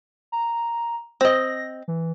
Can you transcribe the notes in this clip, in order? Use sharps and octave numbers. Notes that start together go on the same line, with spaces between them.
A#5
C4 D#5 A#6
E3